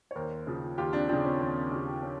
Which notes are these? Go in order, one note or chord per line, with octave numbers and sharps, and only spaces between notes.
C#5
D#2 A#4 C5
C#3 F3
D#2 F4 G4
C4 D4
C#3 F3 C4 D4
C#4
D#2 C4
C#3 F3
C#4